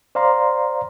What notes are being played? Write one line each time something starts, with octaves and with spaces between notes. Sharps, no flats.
C5 D5 F5 A#5 C6